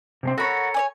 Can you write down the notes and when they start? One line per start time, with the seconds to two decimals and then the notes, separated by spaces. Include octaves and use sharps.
0.23 C3 G#3 C4
0.38 F#4 A4 A#4 C#5 B5
0.74 C#5 D5 G#5